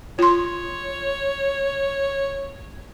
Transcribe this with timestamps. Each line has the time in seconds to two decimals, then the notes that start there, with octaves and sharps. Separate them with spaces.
0.19 F4 C#5 C6